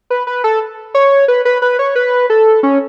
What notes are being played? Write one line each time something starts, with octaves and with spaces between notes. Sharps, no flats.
B4
B4
A4
C#5
B4
B4
B4
C#5
B4
A4
C#4